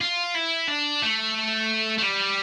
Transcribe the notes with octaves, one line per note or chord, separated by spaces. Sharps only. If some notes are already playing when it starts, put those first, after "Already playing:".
F4
E4
D4
A3
A3
G3